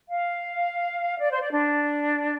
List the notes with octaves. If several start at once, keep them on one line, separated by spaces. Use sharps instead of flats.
F5
D5
C5
D5
D4